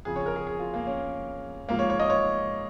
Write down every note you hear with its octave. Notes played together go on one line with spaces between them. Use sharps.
F2 C#3 F3 G#4
C#5
A#4
G#4
G#4
F4
A#3
C#4
G#2 F3 A#3
C#5
C#5
D#5
C#5